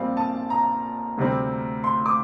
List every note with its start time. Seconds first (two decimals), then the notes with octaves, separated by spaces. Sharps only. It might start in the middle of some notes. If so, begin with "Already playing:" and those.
Already playing: A#1 A#2 G3 C4 F5
0.17 A5
0.50 A#5
1.18 D2 C3 G3 C4
1.84 C6
2.06 D6